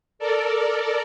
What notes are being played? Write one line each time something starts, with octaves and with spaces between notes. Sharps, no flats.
A4 A#4 D5